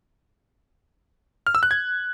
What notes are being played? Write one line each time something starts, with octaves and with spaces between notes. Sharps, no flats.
F6
E6
F#6
G#6